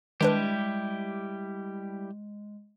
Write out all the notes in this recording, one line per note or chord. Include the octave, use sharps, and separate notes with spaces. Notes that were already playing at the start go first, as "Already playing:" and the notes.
D#3 G3 G#3 D4 E4 G4 B4